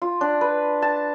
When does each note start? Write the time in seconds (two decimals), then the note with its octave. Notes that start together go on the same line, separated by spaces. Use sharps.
0.02 F4
0.21 D4
0.41 B4
0.82 A5